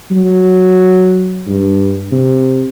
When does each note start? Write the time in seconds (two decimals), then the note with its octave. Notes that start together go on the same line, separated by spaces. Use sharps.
0.11 F#3
1.46 G2
2.12 C3